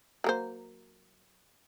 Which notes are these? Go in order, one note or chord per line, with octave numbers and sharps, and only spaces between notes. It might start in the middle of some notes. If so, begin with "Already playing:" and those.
F#3 A#3 C5